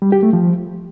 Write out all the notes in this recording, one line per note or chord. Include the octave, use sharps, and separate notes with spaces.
G3
G4
A3
F3